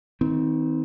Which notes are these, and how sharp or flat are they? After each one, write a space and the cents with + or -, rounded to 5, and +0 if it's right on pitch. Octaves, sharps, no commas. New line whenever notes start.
D#3 +25 C4 -25